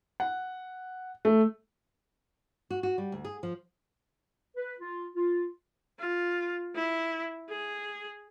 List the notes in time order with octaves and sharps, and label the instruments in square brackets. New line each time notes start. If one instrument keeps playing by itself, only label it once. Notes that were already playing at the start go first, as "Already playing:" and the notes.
[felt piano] F#5
A3
[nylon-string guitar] F#4
F#4
G3
D2
G#4
F3
[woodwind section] B4
F4
F4
[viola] F4
E4
G#4